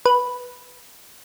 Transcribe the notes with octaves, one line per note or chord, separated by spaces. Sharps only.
B4